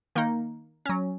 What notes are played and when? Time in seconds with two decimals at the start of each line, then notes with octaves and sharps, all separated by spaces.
0.15 D#3 A#3 D#4
0.86 F#3 C#4